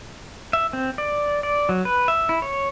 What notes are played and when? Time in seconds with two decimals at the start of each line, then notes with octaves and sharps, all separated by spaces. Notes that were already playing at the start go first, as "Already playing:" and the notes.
0.53 E5
0.73 C4
0.98 D5
1.43 D5
1.69 F#3
1.85 B4
2.08 E5
2.29 E4
2.42 C#5